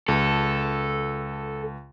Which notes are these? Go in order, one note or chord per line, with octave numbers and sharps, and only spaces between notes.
C#2 A4